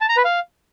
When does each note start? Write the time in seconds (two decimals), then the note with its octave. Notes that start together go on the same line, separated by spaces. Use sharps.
0.01 A5
0.09 A#5
0.17 B4
0.25 F5